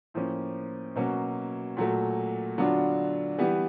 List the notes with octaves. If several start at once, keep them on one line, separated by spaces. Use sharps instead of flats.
A2 F3 A#3 C#4
B2 F#3 A#3 C#4
A#2 F#3 A3
D3 F#3 B3 D4 F4
E3 G3 B3